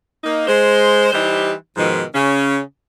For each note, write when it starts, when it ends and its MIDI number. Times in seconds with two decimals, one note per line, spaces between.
0.24 0.43 58
0.24 0.43 63
0.48 1.11 56
0.48 1.11 72
1.13 1.53 52
1.13 1.53 55
1.13 1.53 63
1.13 1.53 67
1.13 1.53 72
1.77 2.02 44
1.77 2.02 47
1.77 2.02 51
1.77 2.02 53
2.14 2.59 49
2.14 2.59 61